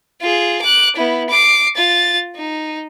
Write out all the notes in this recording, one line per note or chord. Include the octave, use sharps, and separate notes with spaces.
F4 G#4
D6 F#6
B3 E4
D6 C7
F4 A6
D#4